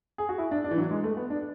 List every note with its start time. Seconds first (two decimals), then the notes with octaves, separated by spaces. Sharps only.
0.18 G#4
0.29 F#4
0.38 E4
0.51 D4
0.64 D4
0.71 E3
0.78 F#3
0.91 G#3
1.04 A3
1.17 B3
1.30 D4